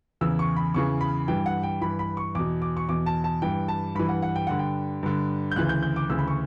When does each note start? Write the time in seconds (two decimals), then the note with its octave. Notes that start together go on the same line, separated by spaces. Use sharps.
0.21 E2 C#3 E3 E6
0.39 C#6
0.56 B5
0.74 E2 C#3 E3 C#6
1.01 B5
1.28 G2 E3 G5
1.46 F#5
1.63 G5
1.81 G2 E3 B5
1.99 B5
2.17 C#6
2.35 E2 B2 D6
2.62 D6
2.77 C#6
2.89 E2 B2 D6
3.06 A5
3.24 A5
3.42 G2 E3 G5
3.68 A5
3.95 G2 E3 B5
4.09 F#5
4.22 F#5
4.36 G5
4.47 G2 D3 F#5
4.59 G5
5.03 G2 D3
5.51 G6
5.56 D2 C#3 E3 F#6
5.69 G6
5.83 G6
5.96 D6
6.10 D2 C#3 E3 E6
6.19 B5
6.28 C#6